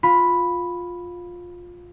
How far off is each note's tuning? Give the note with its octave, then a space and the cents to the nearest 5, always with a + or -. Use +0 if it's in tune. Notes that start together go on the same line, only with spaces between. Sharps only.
F4 +15 B5 +0